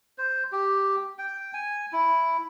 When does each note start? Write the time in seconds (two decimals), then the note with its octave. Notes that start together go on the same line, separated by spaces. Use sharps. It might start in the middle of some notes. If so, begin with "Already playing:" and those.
0.18 C5
0.52 G4
1.19 G5
1.54 G#5
1.93 E4